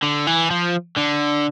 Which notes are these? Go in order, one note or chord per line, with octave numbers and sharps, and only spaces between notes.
D3
E3
F3
D3